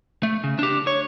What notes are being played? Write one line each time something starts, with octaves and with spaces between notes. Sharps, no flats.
A3
C#3
D4 G4
C#5